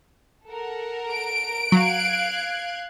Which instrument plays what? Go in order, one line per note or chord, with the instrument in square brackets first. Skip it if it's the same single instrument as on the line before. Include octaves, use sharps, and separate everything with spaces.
[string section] A4 A#4 F#5
[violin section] D7
[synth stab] F#3 [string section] F5 F#6 G#6